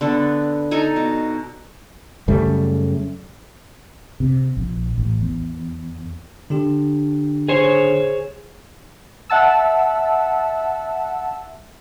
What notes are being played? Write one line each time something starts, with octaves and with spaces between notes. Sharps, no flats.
D3 B3 A4
D#4 A4 G#5 A#5
B2
F#2 C#3 G3 A3
C3
A#1
A1
E2
D3 D4 G4
G#4 C5 C#5
E5 F#5 A5 E6